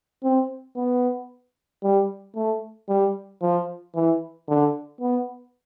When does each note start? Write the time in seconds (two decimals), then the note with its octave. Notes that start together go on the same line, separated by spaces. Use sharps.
0.23 C4
0.76 B3
1.83 G3
2.36 A3
2.88 G3
3.42 F3
3.95 E3
4.48 D3
5.01 B3